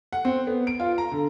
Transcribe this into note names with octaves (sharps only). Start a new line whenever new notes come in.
F#5
C4
B3
D7
F4
A#5
D3